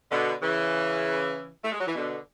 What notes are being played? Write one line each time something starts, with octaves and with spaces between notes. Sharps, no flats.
B2 D3
C#3 E3
A3
G#3
F#3
E3
B2 D3